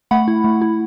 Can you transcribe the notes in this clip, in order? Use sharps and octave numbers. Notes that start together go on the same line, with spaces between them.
A3 F#5 B5
E4
A3
E4